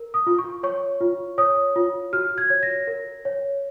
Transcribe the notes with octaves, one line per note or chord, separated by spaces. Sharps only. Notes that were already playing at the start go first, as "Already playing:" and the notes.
Already playing: A#4
D#6
F4
C#6
C#5 C#6
F4
C#5 D#6
F4
F#4 F6
G#6
C#5
A#6
A#4
C#5